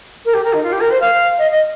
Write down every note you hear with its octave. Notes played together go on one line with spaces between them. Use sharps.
A#4
G4
A#4
D#4
F4
G4
A#4
C5
F5
D#5
D#5